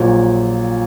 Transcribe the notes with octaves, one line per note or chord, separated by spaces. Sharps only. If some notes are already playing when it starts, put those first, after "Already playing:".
Already playing: A#1 A#2 F#3